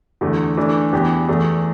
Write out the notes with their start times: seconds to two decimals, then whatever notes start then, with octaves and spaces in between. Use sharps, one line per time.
0.21 E2 D3 A3
0.57 E3 A3 D4
0.93 E2 E3 B3 G4
1.28 E2 E3 A3